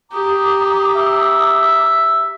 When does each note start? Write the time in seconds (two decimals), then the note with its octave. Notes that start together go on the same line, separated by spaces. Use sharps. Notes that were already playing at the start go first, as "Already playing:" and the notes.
0.12 G4 A#5 D6 D#6
0.96 E5